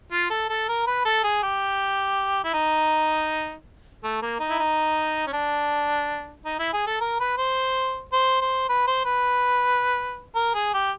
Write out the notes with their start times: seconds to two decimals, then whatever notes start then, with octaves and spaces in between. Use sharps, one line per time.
0.12 F4
0.30 A4
0.49 A4
0.69 A#4
0.87 B4
1.05 A4
1.24 G#4
1.43 G4
2.44 E4
2.54 D#4
4.04 A3
4.22 A#3
4.40 D#4
4.50 E4
4.59 D#4
5.27 C#4
5.33 D4
6.45 D#4
6.59 E4
6.73 G#4
6.87 A4
7.01 A#4
7.20 B4
7.38 C5
8.13 C5
8.41 C5
8.69 B4
8.88 C5
9.06 B4
10.36 A#4
10.55 G#4
10.74 G4